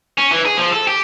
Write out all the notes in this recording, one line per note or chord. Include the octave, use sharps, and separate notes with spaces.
C#4
E3
G#4
F3
A4
G4